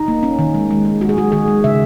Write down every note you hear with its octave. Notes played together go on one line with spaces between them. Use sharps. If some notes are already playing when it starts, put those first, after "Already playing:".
Already playing: D#4
A#3
C#4
D#3
G#3
G#3
G#3
G#3 F#4
G#4
G#3 F#4
D#3 G#4
G#3
C#3 E5